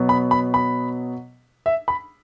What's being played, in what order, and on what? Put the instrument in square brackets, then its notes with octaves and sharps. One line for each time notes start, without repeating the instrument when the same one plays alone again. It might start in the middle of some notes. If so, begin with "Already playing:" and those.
Already playing: [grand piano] B2 F#3 B3
B5
B5
B5
E5
B5